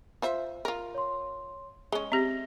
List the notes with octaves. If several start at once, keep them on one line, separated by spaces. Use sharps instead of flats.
F4 C5 E5
F4 A#4
C#5 C6
G#3 C#4 G7
C4 G4 E5 A#6